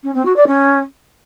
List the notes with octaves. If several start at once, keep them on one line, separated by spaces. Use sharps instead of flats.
C#4
C4
F#4
D5
C#4